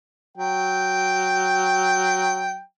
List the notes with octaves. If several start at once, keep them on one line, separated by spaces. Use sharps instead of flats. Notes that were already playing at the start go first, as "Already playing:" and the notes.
F#3 G5